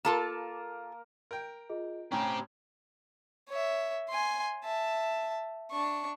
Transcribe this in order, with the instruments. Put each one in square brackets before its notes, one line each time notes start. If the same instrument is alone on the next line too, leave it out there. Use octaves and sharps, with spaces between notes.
[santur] A#3 A#4 [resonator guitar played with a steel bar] F4 A4 A5
[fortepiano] A#4 G5
[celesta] F4 G#4 D#5
[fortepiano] A2 C#4 [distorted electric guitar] C4 G4 [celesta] G5 G#5 B5 [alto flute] A#5
[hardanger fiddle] C#5 E5
G#5 C6
E5 A5
D4 C#6